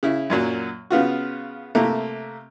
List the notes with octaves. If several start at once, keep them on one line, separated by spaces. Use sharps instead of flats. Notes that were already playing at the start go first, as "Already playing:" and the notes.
C#3 E4
F#2 A#2 F#3
C#3 B3 F4 F#4
C3 A3 A#3